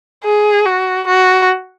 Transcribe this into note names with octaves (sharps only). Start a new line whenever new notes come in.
G#4
F#4
F#4